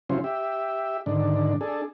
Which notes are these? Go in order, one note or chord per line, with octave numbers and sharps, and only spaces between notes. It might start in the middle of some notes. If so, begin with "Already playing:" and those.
C#3 F#3 C#4 E4 F4 C5
G4 E5
G#2 D3 D#3 D4
D4 G#4 A4